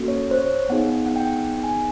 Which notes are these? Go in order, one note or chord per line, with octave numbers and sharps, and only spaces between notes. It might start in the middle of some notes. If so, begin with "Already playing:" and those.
Already playing: A#3 C#4 F#4 A4
C#5
C5
C#5
B3 D#4 G#4 F#5
F#5
G5
G#5